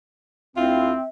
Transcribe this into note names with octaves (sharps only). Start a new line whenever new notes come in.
D2 C4 E4 F4 E5